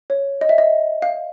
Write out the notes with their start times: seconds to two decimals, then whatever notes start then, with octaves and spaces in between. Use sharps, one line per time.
0.10 C#5
0.41 D#5
0.49 E5
0.58 D#5
1.02 F5